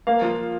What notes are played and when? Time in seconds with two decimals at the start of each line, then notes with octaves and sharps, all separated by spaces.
0.07 A#3 F5
0.22 F3